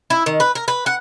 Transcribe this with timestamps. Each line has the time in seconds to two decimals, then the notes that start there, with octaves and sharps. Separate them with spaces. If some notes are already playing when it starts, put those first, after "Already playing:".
0.10 E4
0.26 D#3
0.40 B4
0.55 A#4
0.68 B4
0.86 F#5